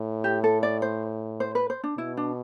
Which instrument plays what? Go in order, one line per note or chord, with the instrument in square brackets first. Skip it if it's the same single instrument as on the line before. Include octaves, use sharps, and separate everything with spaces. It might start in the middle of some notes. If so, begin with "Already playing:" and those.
Already playing: [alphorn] A2
[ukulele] G4
A4
D5
C5
C5
B4
C5
D4
[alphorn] B2 [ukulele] E4
[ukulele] D4